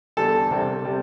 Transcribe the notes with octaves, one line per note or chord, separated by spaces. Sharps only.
E2 D3 G3 A4 A5
C2 C3 G3
C3 G3